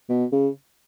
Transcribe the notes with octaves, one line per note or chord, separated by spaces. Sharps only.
B2
C#3